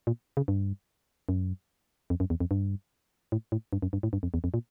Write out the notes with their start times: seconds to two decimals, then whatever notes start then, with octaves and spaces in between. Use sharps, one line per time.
0.07 A#2
0.37 C#3
0.48 G2
1.29 F#2
2.10 F2
2.20 F#2
2.30 E2
2.40 F2
2.51 G2
3.32 A2
3.52 A2
3.73 G2
3.82 F#2
3.93 G2
4.03 A2
4.13 G2
4.23 F2
4.34 E2
4.44 F2
4.54 A#2